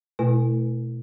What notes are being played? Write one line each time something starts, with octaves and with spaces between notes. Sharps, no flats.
B2 A3 E4 B4 G#5